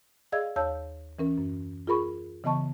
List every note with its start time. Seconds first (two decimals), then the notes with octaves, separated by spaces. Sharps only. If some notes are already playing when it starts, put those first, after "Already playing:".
0.32 G#4 D5 D#5 F5 E6 G#6
0.56 D#2 C#5 F5 A5 E6 G6
1.19 E3 C#4 A#4
1.38 F#2
1.87 F4 G#4 A#4 B5 C#6
2.44 C#3 E3 B3 D#5 A5 C#6